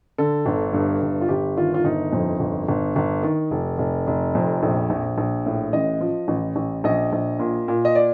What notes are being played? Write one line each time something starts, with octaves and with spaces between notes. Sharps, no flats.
D3 A4
G1
G2
G1
F4
G1 G4
D#3 F4
F4
G1 D#4
F2
G1
G1
G1
D#3
F1
F1
F1
F2
A#1
A#1
A#1
A2
A1 D#5
F3
A1
A1
A#1 D#5
A#1
A#2
A#2
D#5
D5